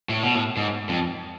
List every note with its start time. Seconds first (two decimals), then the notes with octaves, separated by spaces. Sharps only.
0.09 A2
0.23 B2
0.35 A2
0.57 G#2
0.89 F2